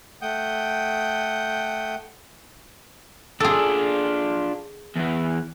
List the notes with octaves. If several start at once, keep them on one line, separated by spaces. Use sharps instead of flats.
A3 F#5 G5 D#6 G6
D4 F4 G#4 A4
E2 E3